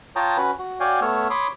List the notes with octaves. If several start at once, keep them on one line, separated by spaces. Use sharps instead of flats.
F4 C#5 G5 A5 A#5 D#6
C#4 F#4 B4
F#4
F#4 C#5 D5 F5 G5 G#5
A3 B3 C#5 E6 F6
C#5 B5 C6 D6 D#6